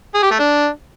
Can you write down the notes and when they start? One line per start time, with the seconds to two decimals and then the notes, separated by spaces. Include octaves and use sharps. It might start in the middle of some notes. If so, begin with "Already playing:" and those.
0.15 G#4
0.23 G4
0.31 A3
0.39 D4